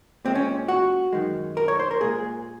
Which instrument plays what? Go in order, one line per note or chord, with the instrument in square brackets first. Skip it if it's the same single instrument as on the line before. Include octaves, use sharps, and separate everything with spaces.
[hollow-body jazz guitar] A#2 G#3 C4
C#4
F#4
F#2 D#3 G#3
A#4
C#5
C5
A#4
A#2 G#3 G#4